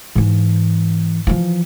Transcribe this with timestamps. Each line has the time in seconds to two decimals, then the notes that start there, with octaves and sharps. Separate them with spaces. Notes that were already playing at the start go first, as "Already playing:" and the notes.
0.16 G#2 E3
1.27 E3 F3